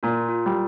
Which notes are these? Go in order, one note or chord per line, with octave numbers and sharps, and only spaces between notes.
A#2 F4
F4
G3